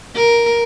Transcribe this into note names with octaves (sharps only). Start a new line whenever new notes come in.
A#4